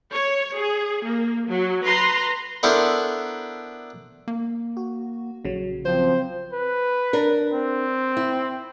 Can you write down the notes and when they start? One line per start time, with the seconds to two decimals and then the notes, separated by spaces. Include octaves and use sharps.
0.12 C#5
0.57 G#4
1.05 A#3
1.49 F#3
1.85 B4 A#5 C6
2.63 B3 D4 E4 A4 A#4 C5
4.28 A#3
4.77 F#4
5.45 A#1 C#3 F#3
5.85 F3 C4 C5
6.53 B4
7.13 D4 A#4
7.53 C4
8.17 E4